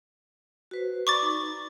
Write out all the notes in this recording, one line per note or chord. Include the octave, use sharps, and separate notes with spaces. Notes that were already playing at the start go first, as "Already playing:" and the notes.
F#4 B4 C5
D5 A#5 B5 C#6 D6 A6
D#4